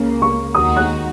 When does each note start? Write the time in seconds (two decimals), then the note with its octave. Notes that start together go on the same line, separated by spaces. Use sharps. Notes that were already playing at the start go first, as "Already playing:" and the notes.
Already playing: C#2 C#3 A#3
0.22 C#6
0.55 D#2 D#3 G#3 D#4 F#4 D#6
0.77 F#6